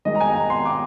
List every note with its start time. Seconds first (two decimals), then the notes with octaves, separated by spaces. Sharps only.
0.05 D#3 G#3 D#4 D#5
0.15 A#5
0.20 G#5
0.35 A#5
0.50 C6
0.65 D6